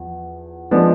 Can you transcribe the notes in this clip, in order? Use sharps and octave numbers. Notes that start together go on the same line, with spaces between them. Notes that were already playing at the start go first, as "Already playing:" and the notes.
Already playing: E2 F3
F3 G#3 B3 D4